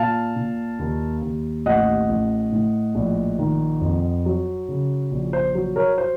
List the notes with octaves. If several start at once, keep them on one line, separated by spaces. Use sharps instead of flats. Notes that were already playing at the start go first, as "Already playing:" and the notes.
Already playing: A#2 F5 A5
A#2
D#2
D#2
A1 D#5 F#5
A1
A2
A#1
D#3
F2
F#3
C#3
A#1
C5
F#3
A#4 C#5
C5